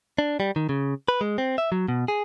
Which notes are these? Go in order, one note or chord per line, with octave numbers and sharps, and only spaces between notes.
D4
G3
D#3
C#3
B4
G#3
C4
E5
F#3
B2
G#4